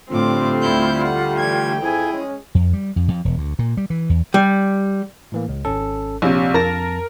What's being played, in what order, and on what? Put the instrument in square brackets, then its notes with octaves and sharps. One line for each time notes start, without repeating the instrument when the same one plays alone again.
[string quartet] A2 D6 [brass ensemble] D3 G3 A3 [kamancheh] C4 [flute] F4
[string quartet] D2 E4 G6
F#5
[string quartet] E3 G#6 [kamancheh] G5
[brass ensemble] F2 G#5 [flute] E4 [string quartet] G#4
[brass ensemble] G#3 C#4
[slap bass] F2
G3
F2
F2
E1
D2
A#2
G3
E3
E2
[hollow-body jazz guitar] G3
[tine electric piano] A2 E3 A#3
C#2
G#1 C#4 A4
[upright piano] A#1 C3 [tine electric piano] C#5
[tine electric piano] F2 A5 A#6 [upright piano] A#4